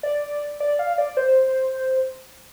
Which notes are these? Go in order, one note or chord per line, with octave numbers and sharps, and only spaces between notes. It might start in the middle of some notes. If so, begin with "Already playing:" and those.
D5
D5
F5
D5
C5